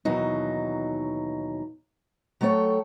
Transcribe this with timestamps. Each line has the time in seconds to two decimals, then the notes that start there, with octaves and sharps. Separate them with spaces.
0.05 D#2 B2 E3 F#3 D#4
2.41 F#3 A3 A4 C5 C#5 G5